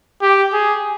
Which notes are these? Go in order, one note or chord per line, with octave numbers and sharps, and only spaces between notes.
G4
G#4